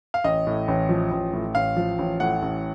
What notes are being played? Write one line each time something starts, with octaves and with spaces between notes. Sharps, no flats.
F5
A1 D#5
A2
A1
F3
A1
A2
A1 F5
F3
A1
A2 F#5
A1